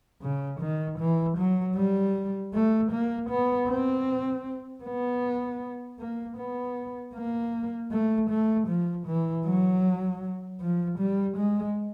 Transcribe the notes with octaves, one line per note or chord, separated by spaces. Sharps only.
C#3
D#3
E3
F#3
G3
A3
A#3
B3
C4
B3
A#3
B3
A#3
A3
A3
F3
E3
F#3
F3
G3
G#3